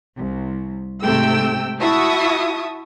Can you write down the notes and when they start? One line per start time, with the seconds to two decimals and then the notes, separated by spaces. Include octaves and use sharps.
0.17 C2
1.03 G#2 C3 A3 G5 E6
1.79 E4 F#4 E5 A5 C#6 D#6